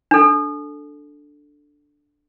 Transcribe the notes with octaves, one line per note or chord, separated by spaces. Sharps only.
D4 A4